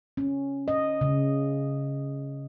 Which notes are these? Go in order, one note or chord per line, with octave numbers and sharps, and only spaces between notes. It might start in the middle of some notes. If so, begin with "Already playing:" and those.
C#4
D#5
C#3